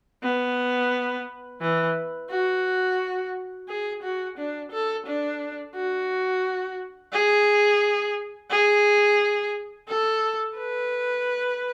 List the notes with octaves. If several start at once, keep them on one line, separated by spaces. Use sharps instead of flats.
B3
E3
F#4
G#4
F#4
D4
A4
D4
F#4
G#4
G#4
A4
B4